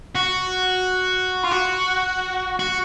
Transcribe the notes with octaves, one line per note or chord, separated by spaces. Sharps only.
F#4
F4
F#4
F#4